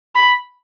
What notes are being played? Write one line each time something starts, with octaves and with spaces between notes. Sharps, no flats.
B5